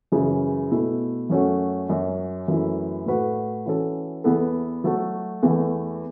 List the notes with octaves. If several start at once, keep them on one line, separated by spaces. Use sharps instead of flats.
F#2 C#3 E3
B2 A3 E4
F#2 F#3 A3 C#4 F#4
F#2 F#3 C#4
F#2 E3 A3 E4
A2 A3 F#4 B4
E3 C#4 F#4 A4
E2 E3 B3 E4 A4
F#3 A3 F#4 A4
E2 E3 A3